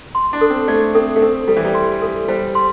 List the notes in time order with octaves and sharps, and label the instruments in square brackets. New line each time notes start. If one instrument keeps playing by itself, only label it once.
[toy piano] C6
[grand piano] D4
[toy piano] A4
[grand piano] C4
[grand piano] A3 [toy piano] D5
[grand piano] C4 [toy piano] A4
[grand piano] A3
[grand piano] C4 [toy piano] A4
[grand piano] G3 [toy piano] A4
[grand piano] E3
G3
[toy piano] C6
A4
[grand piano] G3 [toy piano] C5
[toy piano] C6